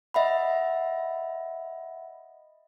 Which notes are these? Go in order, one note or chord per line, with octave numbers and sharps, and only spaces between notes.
D#5 E5 F#5 B5